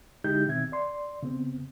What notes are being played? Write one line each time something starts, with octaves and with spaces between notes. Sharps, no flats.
D3 G#3 D#4 E4 G4 G6
B2 D#3 C4 E5 G#6
D5 C6
C#3 B3 C4